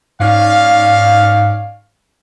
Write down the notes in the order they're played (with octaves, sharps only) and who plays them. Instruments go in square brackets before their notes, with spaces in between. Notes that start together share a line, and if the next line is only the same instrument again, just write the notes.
[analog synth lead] G#2 [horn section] C#4 D5 F5